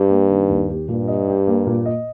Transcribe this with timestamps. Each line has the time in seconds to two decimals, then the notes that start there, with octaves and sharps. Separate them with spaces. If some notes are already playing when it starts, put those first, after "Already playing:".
Already playing: G2 G4
0.10 A#3
0.29 D#3
0.49 D#2
0.69 G4
0.89 G2 A#2
1.08 D#5
1.28 G4
1.47 A#3
1.67 A#2
1.86 D#5